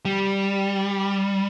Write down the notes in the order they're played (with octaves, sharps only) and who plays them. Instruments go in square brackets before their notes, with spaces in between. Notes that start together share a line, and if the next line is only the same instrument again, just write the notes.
[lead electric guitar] G3